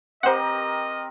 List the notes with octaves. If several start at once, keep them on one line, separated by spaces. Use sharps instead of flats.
C4 G4 A#4 C5 D#5 F#5